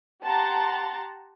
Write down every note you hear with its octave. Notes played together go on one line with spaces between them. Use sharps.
G4 F#5 A5 A#5 C6 A6